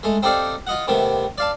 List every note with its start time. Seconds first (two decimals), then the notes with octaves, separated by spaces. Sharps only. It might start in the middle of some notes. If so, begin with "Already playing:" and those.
0.03 G#3 A3
0.23 C4 D#4 G4 A4 D5 F5
0.67 F4 D#5 F#5
0.88 C3 D#3 A3 B3
1.38 D5 F5 A5